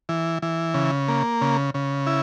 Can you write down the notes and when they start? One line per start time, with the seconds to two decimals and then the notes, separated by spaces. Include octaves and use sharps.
0.09 E3
0.42 E3
0.74 C#3
1.08 A#3
1.41 C#3
1.74 C#3
2.07 E4